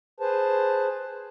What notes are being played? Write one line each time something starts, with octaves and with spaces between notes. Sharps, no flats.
G#4 B4 C5 A5